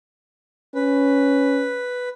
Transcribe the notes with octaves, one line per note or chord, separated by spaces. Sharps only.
C#4 B4